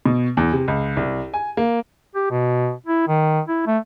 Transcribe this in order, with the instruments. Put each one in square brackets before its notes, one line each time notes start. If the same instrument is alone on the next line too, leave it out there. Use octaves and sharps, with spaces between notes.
[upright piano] B2
E2
C3
C#2
C2
G#5
A#3
[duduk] G4
B2
E4
D#3
E4
A3